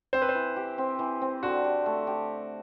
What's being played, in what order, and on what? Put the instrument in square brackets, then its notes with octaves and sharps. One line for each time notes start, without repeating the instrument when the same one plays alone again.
[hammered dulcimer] C4 [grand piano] C5
[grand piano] B4
C5
[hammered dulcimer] E3
G4
C4
E3
C4
[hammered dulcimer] D3 [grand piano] F#4
[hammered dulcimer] G4
A3
G4